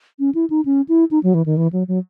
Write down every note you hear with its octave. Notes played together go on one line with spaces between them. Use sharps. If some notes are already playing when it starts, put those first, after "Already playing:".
C#4
E4
D#4
C#4
E4
D#4
F#3
E3
D#3
E3
F#3
F#3